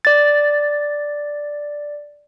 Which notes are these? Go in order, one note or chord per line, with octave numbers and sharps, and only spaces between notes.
D5 A6